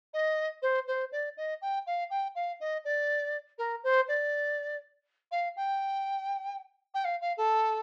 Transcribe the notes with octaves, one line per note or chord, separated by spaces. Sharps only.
D#5
C5
C5
D5
D#5
G5
F5
G5
F5
D#5
D5
A#4
C5
D5
F5
G5
G5
F5
F5
A4